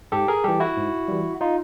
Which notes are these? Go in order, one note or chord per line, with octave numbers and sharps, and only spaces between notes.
G#2 G4 A4
G#4 A#4
E3 G3 G4 A4
E4 F#4
G#2
E3 G3
D#4 F4